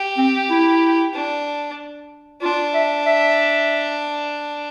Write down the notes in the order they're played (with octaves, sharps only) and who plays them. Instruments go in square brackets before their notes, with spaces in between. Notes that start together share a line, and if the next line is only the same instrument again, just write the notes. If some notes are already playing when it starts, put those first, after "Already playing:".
Already playing: [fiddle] G4
[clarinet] C4
E4
[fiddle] D4
[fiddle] D4 [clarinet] F4
[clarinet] E5
E5